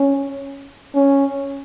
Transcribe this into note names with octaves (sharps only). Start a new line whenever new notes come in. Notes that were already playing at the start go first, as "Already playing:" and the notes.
Already playing: C#4
C#4